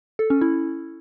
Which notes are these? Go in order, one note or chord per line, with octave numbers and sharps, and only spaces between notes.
A4
C#4
E4